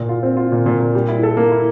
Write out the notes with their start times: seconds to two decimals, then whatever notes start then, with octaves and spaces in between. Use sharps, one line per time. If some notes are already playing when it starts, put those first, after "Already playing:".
Already playing: A#2
0.09 F4
0.23 C4
0.37 F4
0.52 A#2
0.66 A#2
0.80 A#2
0.95 G3
1.08 E4
1.23 A4
1.37 A#3
1.51 E4